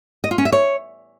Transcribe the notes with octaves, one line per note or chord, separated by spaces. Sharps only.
D#5
F4
C#4
E5
C#5